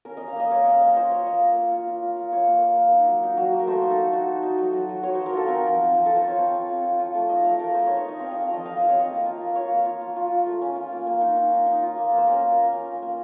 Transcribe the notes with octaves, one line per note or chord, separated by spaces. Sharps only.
C#4 A#4
C#4 D#5
F5
A#3 D#5
A#3 C#5
C#4 D#5
A#3 D#5
F4 C5
F4 C#5
A#3 D#5
A#3
A#3
F4
F4
F4
F4
F4 C#5
A#3
A#3
A#3
D#4
F#3
D#4
F#3
A#3
A#4
A3 C5
D#4
A4
D#4
D#4 F#4
D#4
D#4
F#3
F#3
F#3
F#3 C#5
F#3 C5
A#4
F4 A4
C4 A#4
F3
C4
F3 C5
F4 A4
C5
F4 C#5
C4
F4
C4
F4
F4
A3
D#4 D#5
A3 F5
A3 A#4
A3 C5
D#4 C#5
C#5
D#4 D#5
C4 F5
F4 D#5
F5
F3 D#5
C4 F5
F4 D#5
C#5
C4 D#5
A#3
F4
A#3
F4 C#5
A#3
F4
F4
F4
F4
A3
C#4
F4
A#3
A#3
D#4
D#4
D#4
D#4
F4
A#3
A#3
C5
C#4 A#4
F4
A#3
C#4
A#3
A#3